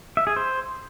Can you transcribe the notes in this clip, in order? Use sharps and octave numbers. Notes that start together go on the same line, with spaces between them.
E5
G#4
C5